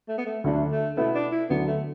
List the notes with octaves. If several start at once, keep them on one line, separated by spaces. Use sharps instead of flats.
A3
B3
A3
D2 D3 F#3 A3 D4
A3
B2 A3 B3 E4
D4
E4
D2 D3 F#3 B3 D4
A3